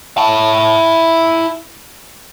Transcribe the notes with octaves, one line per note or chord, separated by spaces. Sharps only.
E4 A5